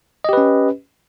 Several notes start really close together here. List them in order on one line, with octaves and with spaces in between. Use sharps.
D#5 G4 B4 C#4